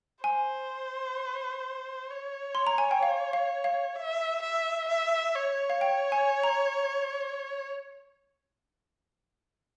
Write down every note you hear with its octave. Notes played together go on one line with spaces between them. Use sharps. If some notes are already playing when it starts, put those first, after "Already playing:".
C5 G#5
C#5
C6
A#5
G#5
G5
F5
F5
F5
E5
E5
E5
C#5
F5
G5
G#5
A#5